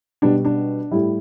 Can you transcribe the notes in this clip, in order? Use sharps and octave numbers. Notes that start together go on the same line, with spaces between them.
B2 G3 D4
D4
A2 G3 E4